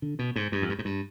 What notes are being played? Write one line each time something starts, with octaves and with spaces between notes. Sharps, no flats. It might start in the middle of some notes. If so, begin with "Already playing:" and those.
D3
B2
G#2
G2
F2
G2
G#2
G2